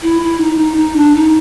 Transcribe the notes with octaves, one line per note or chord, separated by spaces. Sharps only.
E4
E4
D#4
D#4
D#4
D4
D#4